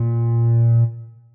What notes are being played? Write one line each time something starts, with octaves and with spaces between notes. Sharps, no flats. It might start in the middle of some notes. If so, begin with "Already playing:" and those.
Already playing: A#2